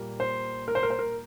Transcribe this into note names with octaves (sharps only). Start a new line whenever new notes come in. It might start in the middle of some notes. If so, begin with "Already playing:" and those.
Already playing: A#2 G3 A#3
C5
A#4
C5
A#4
C5
A#4